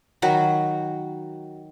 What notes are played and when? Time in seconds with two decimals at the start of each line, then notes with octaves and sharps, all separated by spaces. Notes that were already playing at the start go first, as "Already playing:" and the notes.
0.22 D#3 F#3 F#4 B5